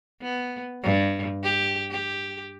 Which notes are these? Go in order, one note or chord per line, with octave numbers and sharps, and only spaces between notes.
B3
G2
G4
G4